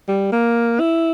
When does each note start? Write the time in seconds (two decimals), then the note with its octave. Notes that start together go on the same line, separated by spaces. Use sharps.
0.08 G3
0.32 A#3
0.80 E4